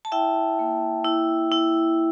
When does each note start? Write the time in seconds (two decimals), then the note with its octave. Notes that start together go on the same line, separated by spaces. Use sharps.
0.05 A5
0.12 E4 E5 G5
0.59 A#3
1.05 E4
1.52 E4